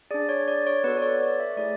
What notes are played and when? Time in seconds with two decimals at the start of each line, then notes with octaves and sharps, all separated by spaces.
0.11 D4 G#4 D5
0.29 C#5
0.48 D5
0.67 C#5
0.84 B3 F#4 A4 B4
0.97 D5
1.02 C#5
1.21 D5
1.40 E5
1.57 A3 E4 G#4 D5